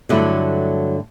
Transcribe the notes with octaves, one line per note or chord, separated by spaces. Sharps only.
G2 D3 F#3 A3 E4